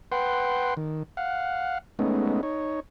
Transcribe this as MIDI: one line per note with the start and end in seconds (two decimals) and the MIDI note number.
0.12 0.74 71
0.12 0.74 78
0.12 0.74 79
0.12 0.74 84
0.77 1.03 51
1.17 1.78 77
1.17 1.78 78
1.99 2.41 56
1.99 2.41 57
1.99 2.41 59
1.99 2.41 61
1.99 2.41 63
2.43 2.80 63
2.43 2.80 73